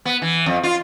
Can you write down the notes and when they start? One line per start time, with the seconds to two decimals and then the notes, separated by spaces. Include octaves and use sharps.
0.05 B3
0.22 E3
0.46 F2
0.63 F4